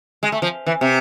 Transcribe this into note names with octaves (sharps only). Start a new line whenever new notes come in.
G#3
A3
F3
E3
C3